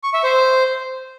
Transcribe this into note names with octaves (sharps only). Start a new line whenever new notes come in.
C#6
E5
C5